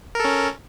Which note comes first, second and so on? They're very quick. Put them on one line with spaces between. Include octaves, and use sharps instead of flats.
A#4 A4 C#4